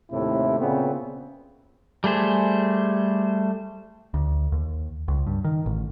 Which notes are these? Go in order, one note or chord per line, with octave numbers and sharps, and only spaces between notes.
D#2 A2 C3 E4
A#2 C#3 B3 C4
G3 A3 G#4 C5
D2
D#2
C#2
G2
D#3
A1